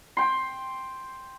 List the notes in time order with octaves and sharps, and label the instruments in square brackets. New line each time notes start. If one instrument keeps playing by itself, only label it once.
[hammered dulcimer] G5 C6